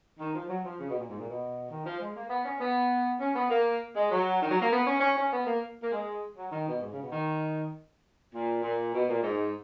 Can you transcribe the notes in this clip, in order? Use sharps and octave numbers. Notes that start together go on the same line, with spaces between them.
D#3
F3
F#3
F3
C#3
B2
A#2
G#2
A#2
B2
D#3
F3
G#3
A#3
B3
C#4
B3
C#4
B3
A#3
G#3
F#3
D#3
F#3
A#3
B3
C#4
C#4
C#4
B3
A#3
A#3
G#3
F#3
D#3
B2
G#2
C#3
B2
D#3
A#2
A#2
B2
A#2
G#2